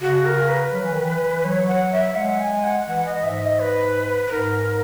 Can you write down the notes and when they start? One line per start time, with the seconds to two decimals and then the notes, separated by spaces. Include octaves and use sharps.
0.01 C#3 F#4
0.25 A#4
0.49 B4
0.72 F#3
0.82 E3
0.91 D#3
1.01 E3
1.44 F#3 C#5
1.68 F#5
1.92 E5
2.16 G#3 F#5
2.40 G#5
2.64 F#5
2.88 E3 F#5
3.06 D#5
3.23 G#2 E5
3.42 D#5
3.60 B4
4.27 B4
4.31 G#2 A#4